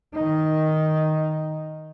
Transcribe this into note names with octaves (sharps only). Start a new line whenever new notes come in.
D#3 D#4